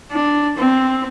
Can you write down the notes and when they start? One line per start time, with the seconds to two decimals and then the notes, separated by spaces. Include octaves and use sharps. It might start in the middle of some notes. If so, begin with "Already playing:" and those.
0.11 D4
0.57 C4